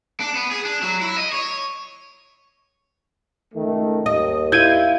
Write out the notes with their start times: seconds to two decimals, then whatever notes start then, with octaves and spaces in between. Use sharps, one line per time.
0.20 D4
0.35 B3
0.51 G#4
0.65 D4
0.82 F#3
1.01 E4
1.18 D#5
1.33 C#5
3.54 C#2 D#3 A3
4.06 D#2 D#5
4.52 E4 F4 G6 G#6 D#7